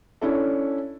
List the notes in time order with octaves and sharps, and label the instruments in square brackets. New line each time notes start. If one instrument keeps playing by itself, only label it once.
[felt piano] C#4 D4 E4 A4